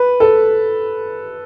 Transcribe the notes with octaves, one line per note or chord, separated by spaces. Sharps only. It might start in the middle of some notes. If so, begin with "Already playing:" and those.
Already playing: B4
A4